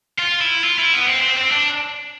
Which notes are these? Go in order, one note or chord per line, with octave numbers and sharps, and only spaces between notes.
F4
E4
F4
E4
B3
C4
C4
C4
D4